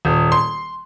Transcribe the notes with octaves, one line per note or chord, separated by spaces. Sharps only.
D#1
C6